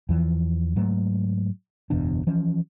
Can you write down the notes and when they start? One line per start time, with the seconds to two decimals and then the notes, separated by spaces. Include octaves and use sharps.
0.09 E2 E3 F3
0.76 G#2 F#3 A3
1.90 F#1 E2 B2 D4
2.27 E3 F3 C#4